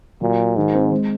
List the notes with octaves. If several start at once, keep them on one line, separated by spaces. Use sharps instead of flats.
A#2 F#3
F#4
G#2 D#3
C4
G#3